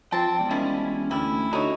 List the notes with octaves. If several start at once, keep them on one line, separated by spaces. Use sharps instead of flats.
F3 C4 G5 A5
E1 G3
D#3 F3 C#4 E4
D2 G3 E4
D3 D#4 F#4 C#5